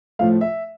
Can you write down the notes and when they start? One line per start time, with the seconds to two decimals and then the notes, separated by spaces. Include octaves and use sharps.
0.19 A2 F3 A3 F5
0.41 E5